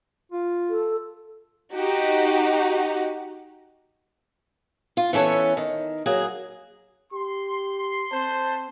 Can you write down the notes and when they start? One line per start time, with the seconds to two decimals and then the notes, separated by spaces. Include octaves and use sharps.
0.32 F4
0.70 A4
1.72 D#4 F#4 G4
4.97 F4
5.13 E3 B3 C#4 A4 C#5
5.57 D#3
6.06 F#3 A#3 G#4
7.13 G4 C6
8.12 C4 C5 A5